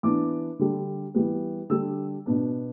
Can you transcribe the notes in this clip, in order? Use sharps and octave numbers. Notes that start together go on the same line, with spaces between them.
E3 B3 D4 D6
D3 G3 D4
E3 G3 B3
D3 G3 D4 E6
B2 B3 D4